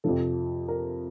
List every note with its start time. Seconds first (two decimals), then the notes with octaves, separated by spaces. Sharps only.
0.04 F2 C3 F3 A4
0.68 A#4